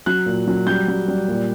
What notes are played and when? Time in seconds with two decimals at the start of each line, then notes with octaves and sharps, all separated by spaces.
0.06 F#3 F#6
0.26 A#2
0.47 F#3
0.67 G3 G6
0.88 G3
1.08 G3
1.28 A#2